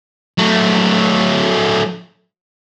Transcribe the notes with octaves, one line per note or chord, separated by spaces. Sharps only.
F#3 A3